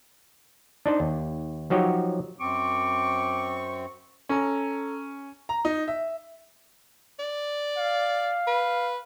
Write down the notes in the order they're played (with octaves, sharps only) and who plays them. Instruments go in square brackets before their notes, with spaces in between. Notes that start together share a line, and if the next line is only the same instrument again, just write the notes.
[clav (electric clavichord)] D4 D#4 C5
D#2
F3 F#3 D#4 F#4 G4 C#5
[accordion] F#2 C4 [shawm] C#6 [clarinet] D6
[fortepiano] C#4 [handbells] A4 A#5
[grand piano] A#5
D#4
E5
[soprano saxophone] D5
[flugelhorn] F5
[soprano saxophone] B4